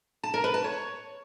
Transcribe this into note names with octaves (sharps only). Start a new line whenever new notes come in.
A5
A#4
B4
A5
C#5